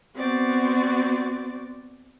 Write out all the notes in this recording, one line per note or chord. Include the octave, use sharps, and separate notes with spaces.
B3 C4 F#4 D5